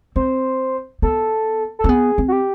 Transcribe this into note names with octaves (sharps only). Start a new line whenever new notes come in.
C4 C5
B3 A4
A4
C4
B3 G#4
C4
F#4
G4